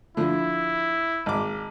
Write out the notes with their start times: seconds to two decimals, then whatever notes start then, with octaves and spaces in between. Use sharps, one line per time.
0.17 D3 F3 E4
1.26 G#1 D6